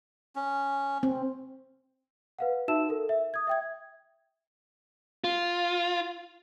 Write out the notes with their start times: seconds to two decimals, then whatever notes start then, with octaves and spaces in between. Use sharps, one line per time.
0.36 C#4
1.03 C4
2.39 B4 F5 F#5
2.68 D#4 F#4 E5 A5 E6 E7
2.89 A4 A#4
3.09 E5
3.34 D#6 G#6
3.47 E5 G5 G#6
5.24 F4